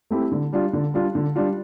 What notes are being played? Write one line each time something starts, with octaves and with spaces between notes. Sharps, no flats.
A3 C4 E4 G4
D3
G3 D4 F4
D3
G3 D4 F4
D3
G3 D4 F4